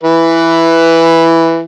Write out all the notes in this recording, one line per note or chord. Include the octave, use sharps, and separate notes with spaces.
E3 B4